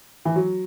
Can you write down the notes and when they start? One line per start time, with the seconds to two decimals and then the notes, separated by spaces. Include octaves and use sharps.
0.25 E3
0.36 F#3